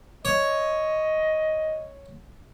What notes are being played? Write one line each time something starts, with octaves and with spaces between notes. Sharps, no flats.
C#5 D#5